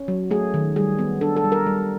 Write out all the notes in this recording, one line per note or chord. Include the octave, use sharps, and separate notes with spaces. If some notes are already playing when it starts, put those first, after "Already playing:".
Already playing: C#4
F#3
A3 G#4
D#3
G3 G#4
B3
D4 A4
A4
G3
A#4
G3